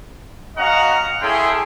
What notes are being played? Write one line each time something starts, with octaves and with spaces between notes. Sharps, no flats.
C#4 F#4 D#5 F5 F#5 A#5
C#4 E4 G#4 A4 G5 C6